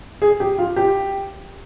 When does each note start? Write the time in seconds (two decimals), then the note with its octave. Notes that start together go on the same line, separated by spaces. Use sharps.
0.22 G#4
0.40 G4
0.58 F4
0.76 G4